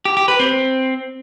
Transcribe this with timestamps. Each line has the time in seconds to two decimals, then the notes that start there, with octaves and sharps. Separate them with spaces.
0.05 G4
0.17 G4
0.28 B4
0.39 C4